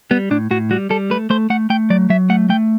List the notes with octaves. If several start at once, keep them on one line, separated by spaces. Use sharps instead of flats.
G3 B3
A2 D4
A2 F#4
G3 F#4
G3 A4
A3 B4
A3 C5
A3 F#5
A3 G5
F#3 D5
F#3 E5
A3 F#5
A3 G5